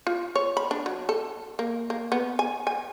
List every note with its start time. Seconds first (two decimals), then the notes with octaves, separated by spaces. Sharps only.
0.07 F4
0.35 C#5
0.57 B5
0.71 D4
0.86 F#3
1.09 A4
1.59 A#3
1.90 A#3
2.12 B3
2.39 G#5
2.67 G#5